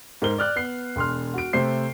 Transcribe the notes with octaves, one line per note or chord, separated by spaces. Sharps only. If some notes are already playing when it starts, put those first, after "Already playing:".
G#2 A#4 C5 G7
D5 F6 F#6
B3 C7
E1 C6 F6
F#4 D7
C3 A3 C5 C7